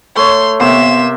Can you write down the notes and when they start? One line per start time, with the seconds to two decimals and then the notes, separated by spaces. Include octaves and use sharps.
0.16 A3 C#5 C6
0.60 C3 A#3 B3 E5 C6 C7 E7